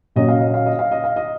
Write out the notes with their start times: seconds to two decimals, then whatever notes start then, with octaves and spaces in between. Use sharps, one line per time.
0.16 A#2 F#3 C#4 D#5
0.29 F5
0.41 D#5
0.54 F5
0.66 D#5
0.79 F5
0.91 D#5
1.04 F5
1.16 D#5